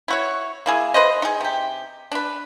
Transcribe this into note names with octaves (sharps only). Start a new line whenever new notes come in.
E4 F#4 C#5
A#3 E4 G#4
B4 C5 D#5
D#4 G#4
C3 G4
D4 B4